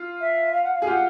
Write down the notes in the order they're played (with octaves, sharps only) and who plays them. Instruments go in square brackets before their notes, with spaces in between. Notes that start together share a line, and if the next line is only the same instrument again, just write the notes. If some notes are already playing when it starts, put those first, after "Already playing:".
Already playing: [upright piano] F4
[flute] E5
F5
F#5
F5
[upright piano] G#4
[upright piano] F4 G4 [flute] F#5